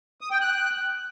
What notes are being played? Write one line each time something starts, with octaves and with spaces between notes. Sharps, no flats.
D#6
G5
F#6